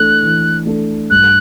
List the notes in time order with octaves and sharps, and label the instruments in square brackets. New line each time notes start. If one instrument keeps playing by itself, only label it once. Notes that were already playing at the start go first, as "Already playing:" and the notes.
Already playing: [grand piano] E3 A3 D4 A4 [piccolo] F#6
[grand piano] E3
A3 D4 A4
[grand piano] G2 [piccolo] F#6